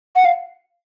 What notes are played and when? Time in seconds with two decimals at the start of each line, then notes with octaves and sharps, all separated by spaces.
0.15 F#5
0.25 F5